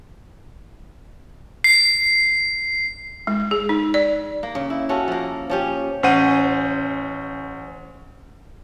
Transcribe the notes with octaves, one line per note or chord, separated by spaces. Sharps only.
C7
G#3
G#4
D#4
D5
A#3
C#3
E4
C#4 F#4 A4
F3 A#3
F3 C#4 G4
A1 C#4 C5 F#5 D#7